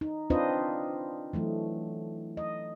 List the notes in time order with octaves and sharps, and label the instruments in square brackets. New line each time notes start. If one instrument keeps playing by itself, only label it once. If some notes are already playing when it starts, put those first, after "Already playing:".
[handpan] D#4
C4 D4 F4 B4 C5 D#5
E3 F#3 A3
D#5